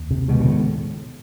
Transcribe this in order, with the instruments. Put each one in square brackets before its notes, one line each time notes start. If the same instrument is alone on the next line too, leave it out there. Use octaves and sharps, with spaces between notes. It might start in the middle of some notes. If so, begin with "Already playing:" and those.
Already playing: [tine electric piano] D#2
[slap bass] C3
[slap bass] B2 [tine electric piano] D#3 G#3 B3
[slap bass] A#2
A2